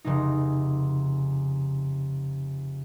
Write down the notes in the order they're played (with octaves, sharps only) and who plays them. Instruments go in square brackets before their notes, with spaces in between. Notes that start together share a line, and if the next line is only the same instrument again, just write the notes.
[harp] F1 C#3 D#4